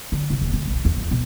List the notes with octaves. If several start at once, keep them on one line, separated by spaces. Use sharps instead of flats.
D3
C2
D#1
D2
B1
E2
F2
B2